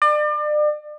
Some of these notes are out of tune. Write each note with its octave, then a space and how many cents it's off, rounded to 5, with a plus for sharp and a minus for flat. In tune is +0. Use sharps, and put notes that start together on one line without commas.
D5 +35